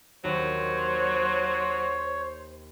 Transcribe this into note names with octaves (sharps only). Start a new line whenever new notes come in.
D#2 F#3 C5 C#5